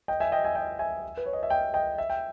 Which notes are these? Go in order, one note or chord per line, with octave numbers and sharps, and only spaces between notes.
D#5 G5
E5 G#5
D#5 G5
E5 G#5
D#5 G5
E5 G#5
B4
C#5
D#5
E5
D#5 G5
D#5 G5
E5
G5